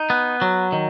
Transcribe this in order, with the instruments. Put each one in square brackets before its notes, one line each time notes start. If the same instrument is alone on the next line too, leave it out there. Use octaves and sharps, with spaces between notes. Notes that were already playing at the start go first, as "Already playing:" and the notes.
Already playing: [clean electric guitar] D#4
B3
F#3
D#3